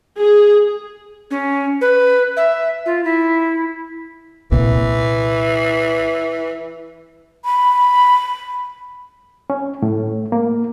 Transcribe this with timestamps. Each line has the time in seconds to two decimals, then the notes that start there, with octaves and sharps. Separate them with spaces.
0.18 G#4
1.31 C#4
1.81 B4
2.37 E5
2.86 F4
3.04 E4
4.52 C2 A#2 E3
7.44 B5
9.50 C#4
9.82 A2
10.32 A#3